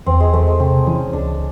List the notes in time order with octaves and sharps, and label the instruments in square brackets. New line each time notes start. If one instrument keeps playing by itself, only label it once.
[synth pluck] E2 [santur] C4
[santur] G#3
[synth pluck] E2 [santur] A3
[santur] G#3
[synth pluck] C3 [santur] C4
[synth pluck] E3 [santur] C#4
[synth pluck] C#2 [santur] D4